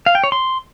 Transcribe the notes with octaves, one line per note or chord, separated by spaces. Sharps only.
F5
G5
C#5
C6